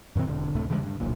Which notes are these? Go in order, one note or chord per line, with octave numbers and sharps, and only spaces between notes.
F#2 A#2 D#3 C4
E1 D3
D2 A2 C3 A3
C#3 E3 G3 G#3
G2
D1 B1 A#2